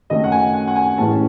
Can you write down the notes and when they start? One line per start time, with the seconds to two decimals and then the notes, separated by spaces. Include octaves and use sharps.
0.10 F#2 D#3 A3 C#4 D#5
0.24 F#5
0.32 G#5
0.54 F#5
0.67 F#5
0.76 G#5
0.98 A1 A2 E3 G#3 C#4 A5